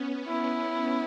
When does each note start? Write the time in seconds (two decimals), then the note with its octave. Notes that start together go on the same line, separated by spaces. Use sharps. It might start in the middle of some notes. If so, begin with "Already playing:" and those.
Already playing: B3 C#4
0.28 E4